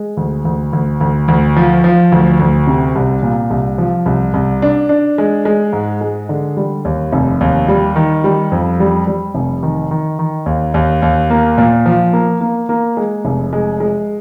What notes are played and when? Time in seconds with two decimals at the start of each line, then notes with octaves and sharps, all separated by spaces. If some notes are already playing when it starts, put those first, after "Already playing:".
Already playing: G#3
0.17 D2
0.45 D2
0.73 D2
1.01 D2
1.28 D2
1.56 F3
1.84 F3
2.12 D2
2.39 D2
2.67 C3
2.95 C2
3.23 A#2
3.50 C2
3.78 F3
4.06 C2
4.34 C2
4.62 D4
4.89 D4
5.18 G#3
5.45 G#3
5.73 G#2
6.01 G#3
6.29 D3
6.57 G3
6.85 D#2
7.13 F1
7.41 D#2
7.68 G3
7.96 D#3
8.24 G3
8.52 F2
8.80 G3
9.07 G3
9.35 F1
9.63 D#3
9.91 D#3
10.19 D#3
10.46 D#2
10.74 D#2
11.02 D#2
11.30 A#3
11.58 A#2
11.86 F3
12.13 A#3
12.41 A#3
12.69 A#3
12.97 G#3
13.25 F1
13.53 G#3
13.80 G#3